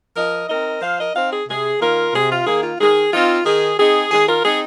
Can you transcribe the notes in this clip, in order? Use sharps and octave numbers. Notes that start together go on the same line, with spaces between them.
F3 A#4 D#5
C4 D#4 A#4 D#5
F3 C5 F5
A#4 D#5
C4 D#4 C5 F5
G#4
C3 G#4
D#3 A#3 F4 A#4
C3 G#4
F4
D#3 A#3 G#4
F4
D#3 G#4
C4 D#4 F4
D#3 G#4
C4 D#4 G#4
D#3 G#4
F4 A#4
C4 D#4 G#4